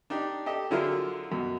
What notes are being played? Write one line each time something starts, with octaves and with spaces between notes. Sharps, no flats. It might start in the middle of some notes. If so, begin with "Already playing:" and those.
D4 D#4 G4
G4 A4 D#5
D3 F#3 E4 F4 G#4 A#4
F#2 B2